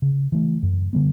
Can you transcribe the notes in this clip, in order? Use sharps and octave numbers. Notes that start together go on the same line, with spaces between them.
C#3
E3 A3
F#2
D3 G3 B3